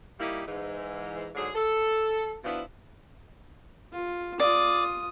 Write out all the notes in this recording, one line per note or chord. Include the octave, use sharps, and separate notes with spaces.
G3 A#3 D#4 E4 G4
G#2 E3
G#2 D3 F#3 G#4
A4
B2 F3 B3 D4 E4
F4
F4 D5 D#6